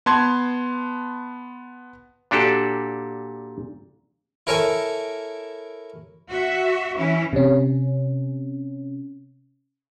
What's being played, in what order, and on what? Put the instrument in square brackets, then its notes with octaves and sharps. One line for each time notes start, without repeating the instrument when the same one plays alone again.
[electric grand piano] B3 A5 C6 G#6
[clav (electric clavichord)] A#2 D4 F#4 G4 A4
[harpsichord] E4 A4 A#4 C#5 G#5
[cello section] F#4 E5
E3 C#4 E4
[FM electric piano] C3 C#4